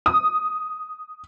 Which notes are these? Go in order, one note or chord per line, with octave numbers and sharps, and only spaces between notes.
D#6